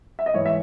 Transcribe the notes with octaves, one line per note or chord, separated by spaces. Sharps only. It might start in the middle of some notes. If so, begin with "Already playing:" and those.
E5
D#5
G#2 E3 C#5
E5